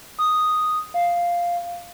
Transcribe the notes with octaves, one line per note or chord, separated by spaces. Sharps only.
D#6
F5